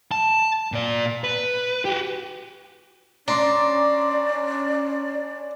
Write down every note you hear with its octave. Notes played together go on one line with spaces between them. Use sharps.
A5
A#2 D5
B4
F#4 G4
C#4 D4 D5 A#5 C6 D6